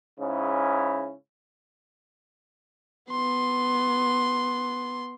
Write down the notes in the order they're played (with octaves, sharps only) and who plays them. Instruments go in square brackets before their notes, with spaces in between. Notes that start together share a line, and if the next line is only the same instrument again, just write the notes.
[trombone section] G#2 C#3 C#4 E4
[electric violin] B3 C6